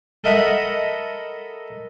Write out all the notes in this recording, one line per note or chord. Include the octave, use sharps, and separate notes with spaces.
A4 A#4 D#5 E5 F#5 B5